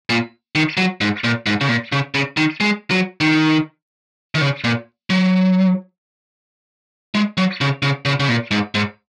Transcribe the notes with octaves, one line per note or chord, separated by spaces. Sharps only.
A#2
D#3
F#3
G#2
A#2
G#2
C#3
A#2
C#3
C#3
D#3
G#3
F#3
D#3
D#3
C#3
A#2
F#3
G#3
F#3
C#3
C#3
C#3
C#3
A#2
G#2
G#2